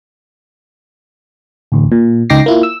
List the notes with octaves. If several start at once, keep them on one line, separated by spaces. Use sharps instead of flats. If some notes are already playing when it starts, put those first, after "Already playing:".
A1 D2
A#2
C#2 D#4 G5 D6 A#6 C7
A#3 E4 F4
E6